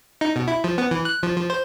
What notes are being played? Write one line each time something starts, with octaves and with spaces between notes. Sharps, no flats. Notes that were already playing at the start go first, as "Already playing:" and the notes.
D#4
B2
E4
F3
B3
E3
F#6
F3
F3
C5